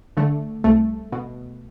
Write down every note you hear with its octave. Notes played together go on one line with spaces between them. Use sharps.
D3 A3
C2 A3
B2